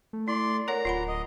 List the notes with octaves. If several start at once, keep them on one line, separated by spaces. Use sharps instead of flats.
A3
E4 D5 C6
A#4 C#5 F#5 A#5
D1 F4 F#5 B5
D#5